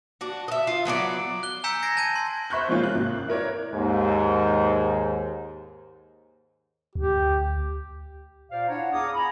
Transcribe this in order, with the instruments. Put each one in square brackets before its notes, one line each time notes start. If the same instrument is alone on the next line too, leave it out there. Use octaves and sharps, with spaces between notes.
[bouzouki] D4 F#4
D#5 E5
F4
F#3 B3 D4 D5
[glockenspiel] F#6 G7
G#5 A#5 E6 G6 B6 C#7
G#6 A#6 C7 D7
A5 G6 G#6 D#7
C6
[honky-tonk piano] C5 E5 B5 C#6 F#6 G6
F3 G#3 A#3 C#4 F4
C3 F#6
G#1 A#3 F#4
E4 A#4 C#5 D5
[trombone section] D#2 G#2
[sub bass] D2 [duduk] G4
[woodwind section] A#2 C5 D5 F5
D4 E4 C#5 D5 F#5 A#5
E2 G#4 F5 A#5 D6 D#6
G#5 A#5 B5